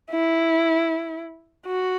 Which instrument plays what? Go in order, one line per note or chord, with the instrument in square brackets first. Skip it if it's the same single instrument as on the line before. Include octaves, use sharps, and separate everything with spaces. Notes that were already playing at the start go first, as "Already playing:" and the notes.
[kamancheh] E4
F#4